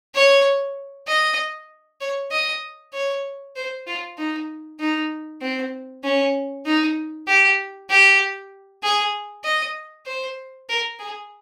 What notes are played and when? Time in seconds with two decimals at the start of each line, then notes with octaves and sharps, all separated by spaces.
0.15 C#5
1.07 D#5
2.01 C#5
2.32 D#5
2.93 C#5
3.56 C5
3.87 F4
4.18 D#4
4.80 D#4
5.42 C4
6.04 C#4
6.66 D#4
7.27 G4
7.90 G4
8.83 G#4
9.44 D#5
10.06 C5
10.69 A#4
10.99 G#4